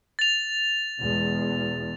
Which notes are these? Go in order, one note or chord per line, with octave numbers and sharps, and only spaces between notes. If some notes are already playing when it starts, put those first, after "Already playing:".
A6 F7
E2 B2 G#3